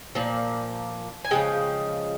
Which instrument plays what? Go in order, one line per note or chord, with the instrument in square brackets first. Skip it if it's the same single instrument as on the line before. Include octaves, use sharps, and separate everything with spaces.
[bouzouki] A#2 F3
G#5
C#3 F3 G#3 G5